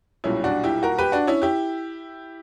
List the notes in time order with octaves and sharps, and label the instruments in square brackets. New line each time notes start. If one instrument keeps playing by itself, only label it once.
[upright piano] B1 A#2 G3 C#4 E4
D4 F#4
E4 G4
F#4 A#4
G4 B4
D4 F#4
C#4 E4
E4 G4